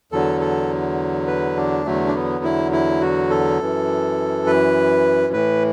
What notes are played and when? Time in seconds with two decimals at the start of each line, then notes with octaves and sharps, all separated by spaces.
0.12 E2 D3 F#3 A4
0.41 A4
1.27 B4
1.57 D4
1.85 E2 D3 F#3 A3
2.07 D4
2.15 B3
2.44 E4
2.72 E4
3.01 F#4
3.30 A4
3.60 F#2 E3
4.47 B4
5.33 A2 E3 B4